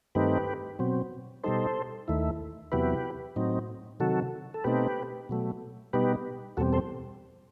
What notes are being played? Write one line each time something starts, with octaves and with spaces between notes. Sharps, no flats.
G2 D#3 A3 C4 D#4 G4 B4
B2 F#3 C4
B2 G3 D#4 A4 C5
D#2 D#3 A3 E4
E2 C3 F#3 B3 E4 G4 B4
A2 F#3 C4 D#4
C3 D#3 F#3 F#4 A4
A4
B2 A3 C4 D#4 G4 B4
B2 F#3 A3
B2 G3 B3 D#4 G4 B4
E2 B2 G3 C4 F#4 A4
A4 C5